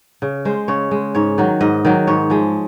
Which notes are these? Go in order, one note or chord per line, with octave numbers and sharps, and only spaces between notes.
C#3
G#3 C5
C#3 C#5
G#3
G#2 C#5
D#3 F#3
G#2 D#5
D#3 F#3
G#2 C#5
F3 G#3